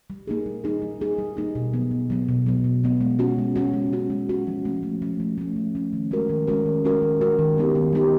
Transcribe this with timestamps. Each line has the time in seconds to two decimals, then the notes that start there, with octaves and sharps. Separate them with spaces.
0.10 G3
0.27 A#3 D#4 G#4
0.46 G3
0.64 A#3 D#4 G#4
0.82 G3
1.00 A#3 D#4 G#4
1.19 G3
1.37 A#3 D#4 G#4
1.55 B2
1.74 F#3 B3
1.91 B2
2.10 F#3 B3
2.29 B2
2.46 F#3 B3
2.64 B2
2.83 F#3 B3
3.01 G#3
3.19 C#4 F#4
3.38 G#3
3.56 C#4 F#4
3.74 G#3
3.92 C#4 F#4
4.10 G#3
4.29 C#4 F#4
4.47 F3
4.65 A3 C#4
4.83 F3
5.02 A3 C#4
5.20 F3
5.38 A3 C#4
5.56 F3
5.75 A3 C#4
5.93 D#3
6.11 G#3 C#4 F#4 A#4
6.29 D#3
6.47 G#3 C#4 F#4 A#4
6.66 D#3
6.85 G#3 C#4 F#4 A#4
7.02 D#3
7.21 G#3 C#4 F#4 A#4
7.39 D#3
7.56 G3 B3 D#4 G4
7.75 D#3
7.93 G3 B3 D#4 G4